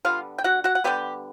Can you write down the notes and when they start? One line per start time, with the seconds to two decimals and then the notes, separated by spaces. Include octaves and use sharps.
0.05 D3 G3 B3 F4 F5
0.38 G5
0.44 F#4 F#5
0.64 F#4 F#5
0.75 F#5
0.84 D3 G3 B3 G4 G5